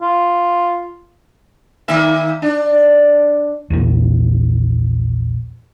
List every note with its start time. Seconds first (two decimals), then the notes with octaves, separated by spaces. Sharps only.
0.02 F4
1.88 D#3 A#3 E5
2.42 D4
3.70 A#1 E2